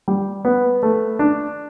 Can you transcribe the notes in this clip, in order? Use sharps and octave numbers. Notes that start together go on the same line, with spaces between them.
G3
B3
A3
D4